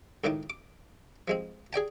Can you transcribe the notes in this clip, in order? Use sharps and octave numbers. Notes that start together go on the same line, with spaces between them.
C#2 A2 D#3 D#4 D6
D6
F3 G#3 C4
G#4 D5 G5 A5